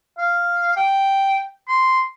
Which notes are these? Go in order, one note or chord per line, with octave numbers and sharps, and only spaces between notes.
F5
G5
C6